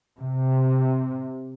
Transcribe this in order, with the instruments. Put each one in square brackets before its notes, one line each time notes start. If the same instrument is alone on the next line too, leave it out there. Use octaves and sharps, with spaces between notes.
[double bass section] C3